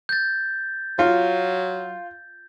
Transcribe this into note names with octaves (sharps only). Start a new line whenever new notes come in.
G6 A6
F#3 F4